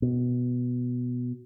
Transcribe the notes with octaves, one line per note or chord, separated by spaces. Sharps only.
B2